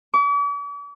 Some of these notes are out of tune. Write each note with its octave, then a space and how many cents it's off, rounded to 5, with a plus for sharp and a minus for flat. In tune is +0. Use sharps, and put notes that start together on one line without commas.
D6 -45